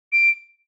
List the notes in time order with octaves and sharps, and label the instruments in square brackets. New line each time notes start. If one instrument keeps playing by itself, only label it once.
[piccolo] D7